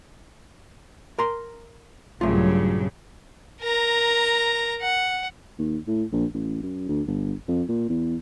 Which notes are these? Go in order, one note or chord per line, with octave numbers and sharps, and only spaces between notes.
A#4 A#5 C6
A#1 G2 A#2 C#3 F#3 A3 F4
A#4 A#5
F#5
D#2
A2
A#1
A1
F#2
D2
G1
F2
A#2
E2